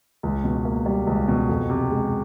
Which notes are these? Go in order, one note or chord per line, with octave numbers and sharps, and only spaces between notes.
C#2
B2
A#3
G3
C#2
B2
F2
C3
G#3